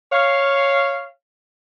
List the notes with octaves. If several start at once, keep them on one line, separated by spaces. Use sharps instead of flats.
C#5 F5